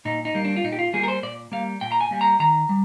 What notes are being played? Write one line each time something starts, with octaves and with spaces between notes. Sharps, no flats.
A#2 D#4
D#4
G3 A#3
D4
F4
A#2 D#4
G4
F4
G3 A#3 G#4
A#4
C5
A#2 D5
G3 A#3 F5
A#2 G5
A#5
G#5
G3 A#3
A#5
D#3 A#5
G3